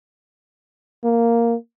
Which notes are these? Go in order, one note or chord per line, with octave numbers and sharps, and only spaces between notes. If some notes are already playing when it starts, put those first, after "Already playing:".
A#3